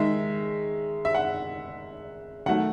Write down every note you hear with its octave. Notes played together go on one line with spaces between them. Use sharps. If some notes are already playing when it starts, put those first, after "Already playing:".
Already playing: D#3 G#3 E5
E5
F#5
D#3 F#3 A3 F#5